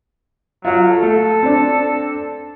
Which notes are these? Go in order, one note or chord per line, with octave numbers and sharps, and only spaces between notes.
F#3 F4 F5
A4
A3
C4 D4